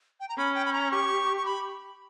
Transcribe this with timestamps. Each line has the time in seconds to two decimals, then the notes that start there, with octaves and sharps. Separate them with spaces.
0.20 G5
0.29 A#5
0.37 C#4 B5
0.55 G5
0.65 B5
0.73 A#5
0.91 G4 C#6
1.37 C#6
1.46 B5